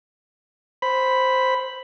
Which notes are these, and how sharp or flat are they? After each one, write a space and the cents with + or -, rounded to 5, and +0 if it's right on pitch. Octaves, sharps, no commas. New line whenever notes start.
C5 +0 B5 +0